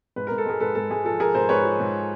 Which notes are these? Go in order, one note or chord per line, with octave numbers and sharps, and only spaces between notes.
G#2 B4
G#2 A#4
A4
G#3 G#4 A#4
G#2 A4 B4
G#2 A4
G#3 G#4
F3 A4
F3 G#4 A#4
G#2 A#4 C5
G#2 B4 C#5
F3
G#2